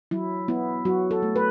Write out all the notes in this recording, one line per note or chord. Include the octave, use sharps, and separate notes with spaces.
F#3 E4
B3 E4
F#3 F#4
A4
A3
B4